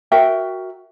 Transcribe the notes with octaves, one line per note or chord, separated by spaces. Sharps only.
F#4 A#4 E5 G5